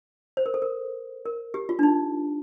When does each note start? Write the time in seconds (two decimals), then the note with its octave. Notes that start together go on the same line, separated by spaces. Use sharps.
0.37 C5
0.46 A#4
0.54 A4
0.62 A#4
1.25 A#4
1.54 G4
1.69 F4
1.79 D4
1.83 D#4